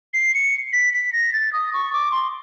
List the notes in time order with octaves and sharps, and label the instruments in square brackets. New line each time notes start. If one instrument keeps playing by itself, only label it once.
[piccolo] C7
C#7
B6
B6
A#6
A6
D#6
C#6
D6
C6